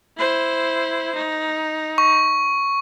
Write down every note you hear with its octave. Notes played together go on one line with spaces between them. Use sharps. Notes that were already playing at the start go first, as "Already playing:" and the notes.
E4 C5
D#4
C#6